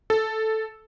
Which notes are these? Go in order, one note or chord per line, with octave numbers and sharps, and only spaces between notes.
A4